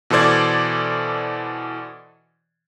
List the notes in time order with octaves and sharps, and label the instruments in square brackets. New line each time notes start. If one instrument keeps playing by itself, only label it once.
[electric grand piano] B2 E3 A4 C5 D5 G#6